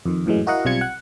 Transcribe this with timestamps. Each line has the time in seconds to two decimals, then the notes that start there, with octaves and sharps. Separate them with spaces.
0.06 F2 D#3
0.26 F#2 A2 E3 F#3 G#3
0.47 E4 F#4 A#4 D#5 F5 F#5
0.65 B1 C3 G3 F4 G#6 C#7
0.81 F#5